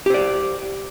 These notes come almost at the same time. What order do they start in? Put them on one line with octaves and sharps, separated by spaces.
G4 C5 D5